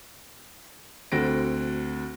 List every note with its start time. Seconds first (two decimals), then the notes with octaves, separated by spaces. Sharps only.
1.12 D2 D3 C4 F#4 A#6 D7